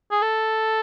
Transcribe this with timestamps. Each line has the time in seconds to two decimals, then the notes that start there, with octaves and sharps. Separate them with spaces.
0.11 G#4
0.22 A4